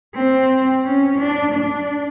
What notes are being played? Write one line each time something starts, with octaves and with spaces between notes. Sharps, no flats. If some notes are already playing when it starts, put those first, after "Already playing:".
C4
C#4
D4
D4